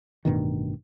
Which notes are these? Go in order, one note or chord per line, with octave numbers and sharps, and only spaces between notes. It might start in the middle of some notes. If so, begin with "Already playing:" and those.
A1 G2 B2 D#3